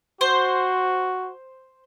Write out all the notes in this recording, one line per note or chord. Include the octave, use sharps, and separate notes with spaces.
F#4 C5